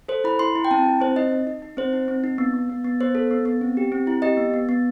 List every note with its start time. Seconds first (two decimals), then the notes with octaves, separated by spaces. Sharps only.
0.08 A4 C5
0.24 E4 B5
0.39 E4 C6
0.56 E4
0.65 G5
0.71 C4 A5
0.86 E4
1.00 C4 C5
1.16 D#4 D#5
1.32 D#4
1.47 D#4
1.62 D#4
1.77 C4 C5
1.93 D#4
2.08 C4
2.24 D#4
2.38 B3
2.54 B3
2.70 B3
2.84 B3
3.01 B3 C5
3.15 A4
3.31 B3
3.45 B3
3.61 C4
3.77 G4
3.92 C4
4.07 E4
4.22 G4 D#5
4.37 B3
4.54 B3
4.69 B3